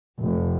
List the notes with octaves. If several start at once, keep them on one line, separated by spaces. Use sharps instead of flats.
F1